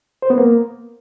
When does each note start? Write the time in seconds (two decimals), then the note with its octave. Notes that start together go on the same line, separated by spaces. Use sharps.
0.22 C5
0.30 B3
0.38 A#3